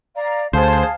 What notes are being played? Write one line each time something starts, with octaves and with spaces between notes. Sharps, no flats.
D5 F5 A#5
D2 G#4 C5 F5 A5